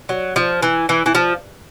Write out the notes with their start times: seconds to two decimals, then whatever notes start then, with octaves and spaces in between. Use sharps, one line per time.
0.09 F#3
0.36 F3
0.62 E3
0.89 E3
1.06 E3
1.15 F3